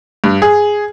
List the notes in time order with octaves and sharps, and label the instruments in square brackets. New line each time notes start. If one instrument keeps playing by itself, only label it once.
[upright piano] G2
G#4